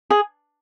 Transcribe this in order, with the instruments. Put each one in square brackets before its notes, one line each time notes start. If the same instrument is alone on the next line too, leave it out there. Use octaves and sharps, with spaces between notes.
[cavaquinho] G#4